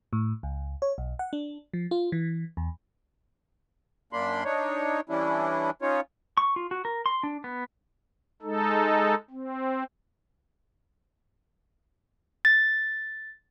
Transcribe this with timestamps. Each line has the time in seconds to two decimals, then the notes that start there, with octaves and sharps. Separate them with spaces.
0.13 A2
0.43 C#2
0.82 C#5
0.98 B1
1.19 F#5
1.33 D4
1.74 F3
1.91 F4
2.12 E3
2.57 E2
4.13 F#2 A#3 D4 B5 C6
4.44 D4 D#4 C#5
5.09 E3 G3 C#4 D4 E4
5.82 C#4 D#4 F4 C#5
6.37 C#6
6.56 F4
6.71 F#4
6.85 A#4
7.06 C6
7.23 D4
7.44 B3
8.42 G#3 D#4 A4
9.30 C4
12.45 A6